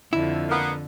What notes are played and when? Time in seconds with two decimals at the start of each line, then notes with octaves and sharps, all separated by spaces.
0.13 F2 D3 E4
0.49 A#3 B3